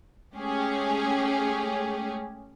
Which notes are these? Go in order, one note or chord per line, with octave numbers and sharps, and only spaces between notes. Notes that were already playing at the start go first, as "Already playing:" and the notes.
G#3 A3 C#4 G4 G#4